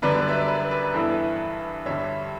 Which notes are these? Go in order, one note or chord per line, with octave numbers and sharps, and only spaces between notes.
F#2 D3 G3 B3 B4 D5
B4
E5
B4 D5
B4
B4
B4
B4
G2 E3 B3 E4 A4
B4
G2 D3 G3 C#5 E5